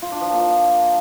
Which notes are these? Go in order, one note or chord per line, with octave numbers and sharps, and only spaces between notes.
F4
D4
F3
A#3
F3